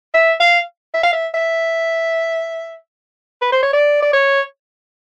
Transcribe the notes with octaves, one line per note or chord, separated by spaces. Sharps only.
E5
F5
E5
F5
E5
E5
B4
C5
C#5
D5
D5
C#5